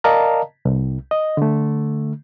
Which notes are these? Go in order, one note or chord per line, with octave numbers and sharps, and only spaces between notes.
A#4 D5 D#5 F5 A5 A#5
C2
D#5
D3 A3